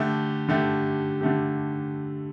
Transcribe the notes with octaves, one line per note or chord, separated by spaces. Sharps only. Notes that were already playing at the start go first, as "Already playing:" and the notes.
Already playing: D3 A3 G4
D3 A3 G4
D3 A3 G4